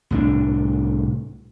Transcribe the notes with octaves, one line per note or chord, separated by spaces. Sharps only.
C2 A2 G#3 D4